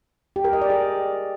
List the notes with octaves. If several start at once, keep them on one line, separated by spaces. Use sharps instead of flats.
G4
A#4
D#5
D5
G#4